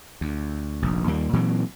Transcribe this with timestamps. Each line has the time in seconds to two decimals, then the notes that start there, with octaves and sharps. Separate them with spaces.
0.21 D2
0.82 F1 A#1
1.07 D#2 G3 A#3
1.33 A#2 E3 F#3 C4